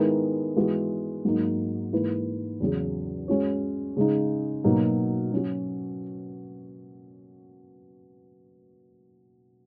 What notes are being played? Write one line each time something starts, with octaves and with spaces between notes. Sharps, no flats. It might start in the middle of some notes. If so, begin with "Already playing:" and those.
Already playing: D#3 G#3 B3 E4 A#4
E3 G#3 B3 F#4
G#2 F#3 A#3 D#4
G#2 E3 A#3 E4 B4
E2 C#3 F#3 C#4 G#4
G#3 C#4 F#4 C#5
C#3 G#3 D#4
B2 F#3 A#3 D#4
F#3 C#4 F#4